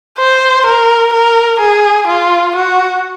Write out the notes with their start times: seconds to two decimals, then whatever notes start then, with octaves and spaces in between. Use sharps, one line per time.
0.19 C5
0.66 A#4
1.13 A#4
1.60 G#4
2.08 F4
2.56 F#4